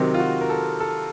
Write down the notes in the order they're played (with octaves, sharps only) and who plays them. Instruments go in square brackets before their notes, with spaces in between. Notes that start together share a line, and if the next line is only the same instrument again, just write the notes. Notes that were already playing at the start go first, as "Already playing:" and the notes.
Already playing: [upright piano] C3 D#3 F#3 C4
[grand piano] F4
F#4
A#4
A4
A4